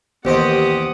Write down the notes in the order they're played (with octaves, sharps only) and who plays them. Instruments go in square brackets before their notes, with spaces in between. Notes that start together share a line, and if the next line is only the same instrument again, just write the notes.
[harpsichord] A1 D#2 D#5 [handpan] B3 C5 [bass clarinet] G4 [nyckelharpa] F#5 D#6